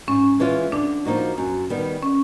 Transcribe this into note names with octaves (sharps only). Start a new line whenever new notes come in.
G#2 C#4
E3 G#3 C#4 F4
D3 D4
F3 A#3 D#4 F#4
F#2
D#3 G3 B3
C#4